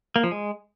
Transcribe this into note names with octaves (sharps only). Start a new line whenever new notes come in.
A#3
F3
G#3